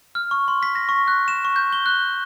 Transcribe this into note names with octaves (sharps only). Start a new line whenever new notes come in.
F6
C#6
C6
B6
A#6
C#6
F#6
E7
C#6
G6
G7
F#6